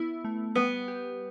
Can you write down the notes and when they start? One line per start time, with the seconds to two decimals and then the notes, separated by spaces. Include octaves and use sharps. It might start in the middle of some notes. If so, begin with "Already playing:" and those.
Already playing: B3 E4
0.24 A3
0.55 G3 B3
0.88 G4